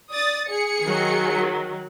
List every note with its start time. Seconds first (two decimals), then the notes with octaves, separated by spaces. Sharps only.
0.12 D5 D#6 A6
0.49 G#4 C#7
0.83 D#3 F#3